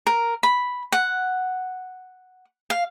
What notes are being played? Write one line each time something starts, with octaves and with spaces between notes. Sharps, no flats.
A#4
B5
F#5
F5